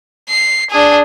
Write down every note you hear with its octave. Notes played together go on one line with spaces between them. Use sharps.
C7
D4 G#4